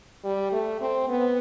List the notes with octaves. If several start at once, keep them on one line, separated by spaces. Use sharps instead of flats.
G3
A3
C4
B3